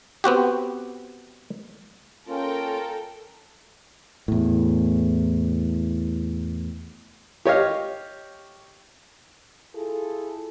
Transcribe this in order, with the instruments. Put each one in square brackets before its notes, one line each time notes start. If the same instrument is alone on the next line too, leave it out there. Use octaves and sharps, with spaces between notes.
[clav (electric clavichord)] B3 C4 F#4 G4
[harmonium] A#3 C#4 F4 [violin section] A4 A#4 G5
[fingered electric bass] E2 A2
[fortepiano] G4 C#5 D#5 F5
[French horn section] E4 F4 G#4 A4